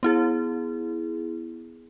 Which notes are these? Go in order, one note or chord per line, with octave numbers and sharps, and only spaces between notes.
B3 E4 G#4